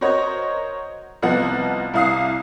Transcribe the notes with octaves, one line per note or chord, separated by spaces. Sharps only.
F#4 A#4 C5 C#5 D#5
C2 F3 B3 C4 D#5 F#5
C2 E4 F5 D#6 C7